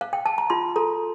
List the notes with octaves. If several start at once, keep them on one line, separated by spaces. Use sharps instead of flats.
F5
G5
A5
A#5
F4 C6
A4 A#5